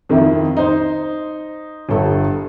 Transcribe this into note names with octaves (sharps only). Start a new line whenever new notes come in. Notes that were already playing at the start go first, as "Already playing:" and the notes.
F2 D#3 E4
D#4 C5
G1 G2 A4